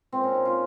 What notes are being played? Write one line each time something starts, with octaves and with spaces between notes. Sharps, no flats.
A#2 G#3 C4
C#4
D#4
F4